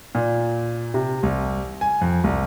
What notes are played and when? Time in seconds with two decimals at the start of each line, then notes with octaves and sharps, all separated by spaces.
0.15 A#2
0.94 C3
1.23 C2
1.81 G#5
2.01 F2
2.24 C2